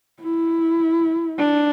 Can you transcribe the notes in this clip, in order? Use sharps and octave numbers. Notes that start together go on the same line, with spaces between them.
E4
D4